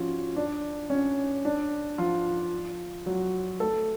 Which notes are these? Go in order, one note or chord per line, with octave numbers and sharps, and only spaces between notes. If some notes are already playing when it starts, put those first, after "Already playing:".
Already playing: F3 C#4 F4 F#4
D4
C#4
D4
F3 F4
F#3 F#4
A3 A4